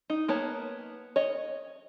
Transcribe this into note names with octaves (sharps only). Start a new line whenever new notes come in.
D#4
A#3 B3 C#5 A5
C#5 D#5